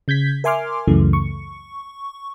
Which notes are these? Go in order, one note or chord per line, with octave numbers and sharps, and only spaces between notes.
C#3 G6 G#6 B6
A#4 E5 G#5 C6 D6 F6
C#2 F#2 C#3 E3 A3
C#6